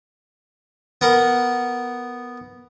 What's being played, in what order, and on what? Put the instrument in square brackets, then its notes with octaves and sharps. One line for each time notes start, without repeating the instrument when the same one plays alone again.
[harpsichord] B3 A#4 F#5